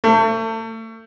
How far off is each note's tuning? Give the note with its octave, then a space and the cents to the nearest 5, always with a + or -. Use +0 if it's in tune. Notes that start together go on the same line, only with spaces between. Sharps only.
A3 +35